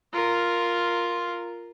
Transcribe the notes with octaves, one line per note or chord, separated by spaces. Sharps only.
F4 A#4